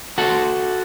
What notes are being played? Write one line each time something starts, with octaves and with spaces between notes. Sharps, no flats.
F#4 A4